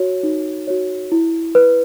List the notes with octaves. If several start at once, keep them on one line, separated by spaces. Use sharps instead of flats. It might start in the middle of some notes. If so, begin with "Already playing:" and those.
Already playing: F#4 C#5
D#4
F#4 C#5
E4
B4